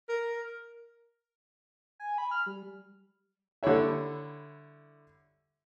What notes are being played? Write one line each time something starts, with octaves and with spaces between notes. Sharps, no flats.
A#4
G#5
B5
F6
G3
D3 G3 E4 C#5 E5